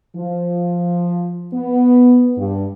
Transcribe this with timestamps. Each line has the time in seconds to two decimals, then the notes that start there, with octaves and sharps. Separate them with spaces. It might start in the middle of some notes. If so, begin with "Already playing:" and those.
0.16 F3
1.54 B3
2.38 G2